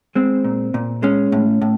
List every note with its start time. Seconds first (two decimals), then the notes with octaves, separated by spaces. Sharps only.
0.15 G#3 C4
0.45 A#2
0.74 A#2
1.03 G#3 C#4
1.32 A2
1.62 A2